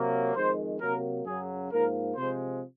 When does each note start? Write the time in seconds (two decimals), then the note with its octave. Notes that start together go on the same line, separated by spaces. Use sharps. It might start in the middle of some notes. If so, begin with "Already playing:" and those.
Already playing: C3 F#3 A#3
0.36 F2 D#3 G#3 C5
0.80 C3 F#3 A#3 A#4
1.26 F#2 C#3 F#3 G#4
1.72 G#2 F3 A#3 A#4
2.16 C3 F3 G#3 C5